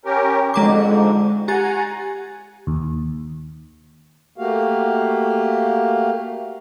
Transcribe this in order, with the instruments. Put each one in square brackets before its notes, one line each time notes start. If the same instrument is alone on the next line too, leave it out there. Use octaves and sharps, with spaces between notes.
[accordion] C#4 G4 A#4
[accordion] F2 G#2 D3 [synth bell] G#3 A#5 D6
[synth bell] G4 A6 [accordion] F#5 G#5 A#5
[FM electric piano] D#2
[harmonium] A3 A#3 F#4 G4 F5